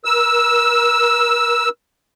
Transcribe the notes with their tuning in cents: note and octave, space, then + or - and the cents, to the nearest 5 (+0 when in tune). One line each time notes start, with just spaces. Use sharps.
A#4 +35 E6 +0